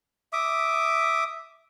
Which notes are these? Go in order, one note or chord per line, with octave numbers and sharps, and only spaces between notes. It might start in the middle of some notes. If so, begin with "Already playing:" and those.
E5 D6 D#6